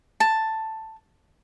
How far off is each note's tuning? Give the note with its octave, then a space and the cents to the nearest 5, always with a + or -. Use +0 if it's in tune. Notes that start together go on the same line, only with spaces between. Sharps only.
A5 +5